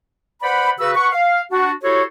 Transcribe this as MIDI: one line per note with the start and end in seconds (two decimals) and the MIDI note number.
0.42 0.71 71
0.42 0.71 72
0.42 0.71 74
0.42 0.71 78
0.42 0.71 83
0.79 0.92 49
0.79 0.92 66
0.79 0.92 71
0.79 0.92 88
0.96 1.08 71
0.96 1.08 78
0.96 1.08 85
1.12 1.41 77
1.51 1.72 62
1.51 1.72 66
1.82 2.03 64
1.82 2.03 66
1.82 2.03 67
1.82 2.03 69
1.82 2.03 72
1.82 2.03 73